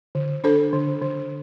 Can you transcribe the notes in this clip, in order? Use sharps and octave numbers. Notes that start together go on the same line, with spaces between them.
D3
D4 A4 C5
D3
D3